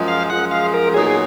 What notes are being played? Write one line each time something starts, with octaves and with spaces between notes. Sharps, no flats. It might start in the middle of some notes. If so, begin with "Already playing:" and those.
Already playing: F#2 F3 G#3
F5
F#2 F3 G#3 F#5
F5
A#4
A#2 F#3 B3 D#4 G#4
G#4